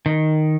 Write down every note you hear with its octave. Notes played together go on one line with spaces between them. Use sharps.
D#3